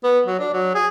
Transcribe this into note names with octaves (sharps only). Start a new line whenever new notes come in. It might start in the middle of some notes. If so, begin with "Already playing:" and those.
B3
F#3
D4
F#3
G#4